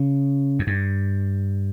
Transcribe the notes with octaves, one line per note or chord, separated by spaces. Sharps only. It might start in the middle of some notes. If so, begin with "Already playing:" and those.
Already playing: C#3
F#2
G2